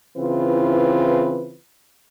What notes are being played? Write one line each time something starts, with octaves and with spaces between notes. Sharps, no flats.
C#3 E3 C4 E4 F4 B4